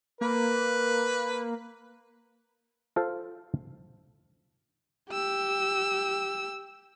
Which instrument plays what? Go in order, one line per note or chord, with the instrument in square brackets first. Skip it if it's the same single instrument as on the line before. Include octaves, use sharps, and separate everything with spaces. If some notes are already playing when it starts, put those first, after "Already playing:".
[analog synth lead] A#3 [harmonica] B4
[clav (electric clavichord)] F4 A4 C5 F5
[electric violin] G4 E6